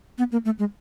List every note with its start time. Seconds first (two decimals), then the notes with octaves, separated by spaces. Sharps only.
0.18 B3
0.32 A#3
0.45 A3
0.59 G#3